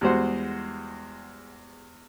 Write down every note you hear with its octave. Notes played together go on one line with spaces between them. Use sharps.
E2 G3 G#3 F#4 C5 F#5